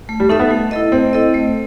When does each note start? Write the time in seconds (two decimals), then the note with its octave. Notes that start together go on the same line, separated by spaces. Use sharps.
0.09 A3
0.20 G3
0.29 A3 D#4 A4 E5
0.39 B3
0.51 A3
0.71 E4 A4 D#5
0.92 A3 C4
1.13 E4 A4 D#5
1.34 A3